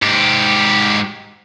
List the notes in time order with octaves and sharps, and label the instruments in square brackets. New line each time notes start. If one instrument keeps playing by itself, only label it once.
[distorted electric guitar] G#2 G4